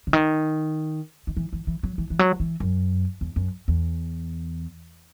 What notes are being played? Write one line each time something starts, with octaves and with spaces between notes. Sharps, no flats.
C#3
D#3
D#3
E3
E3
E3
F#3
E3
E3
F#3
E3
F#2
E2
F#2
E2